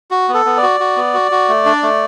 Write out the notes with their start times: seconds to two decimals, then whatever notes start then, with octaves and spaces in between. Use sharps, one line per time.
0.11 F#4
0.28 B3
0.34 A4
0.45 B3
0.57 D5
0.63 F#4
0.80 F#4
0.96 B3
1.14 F#4
1.31 F#4
1.48 A3
1.66 D4
1.83 A3